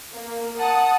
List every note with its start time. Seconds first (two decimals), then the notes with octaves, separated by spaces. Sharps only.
0.14 A#3
0.59 F#5 A5 D#6